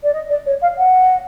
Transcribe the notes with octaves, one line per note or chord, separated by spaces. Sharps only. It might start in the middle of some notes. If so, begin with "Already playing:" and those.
D5
D#5
D5
C#5
F5
F#5